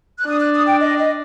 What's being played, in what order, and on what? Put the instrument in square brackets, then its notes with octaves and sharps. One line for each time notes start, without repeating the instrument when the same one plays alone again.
[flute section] F#6
[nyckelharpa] D4 [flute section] D#6
[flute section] F#6
D#6
G5
D#5
D#5